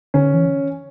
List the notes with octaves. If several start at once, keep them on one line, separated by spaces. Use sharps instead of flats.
D3 C#4
E3